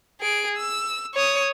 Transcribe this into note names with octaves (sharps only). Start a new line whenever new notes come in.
G#4 D7
E6
C#5 D#6